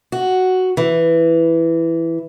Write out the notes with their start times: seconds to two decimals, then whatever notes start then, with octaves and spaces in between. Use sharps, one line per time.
0.12 F#4
0.77 E3